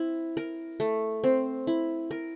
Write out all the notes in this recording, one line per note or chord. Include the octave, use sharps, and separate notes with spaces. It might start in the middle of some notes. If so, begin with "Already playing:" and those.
Already playing: C4 E4
A#4
A3
C4
E4
A#4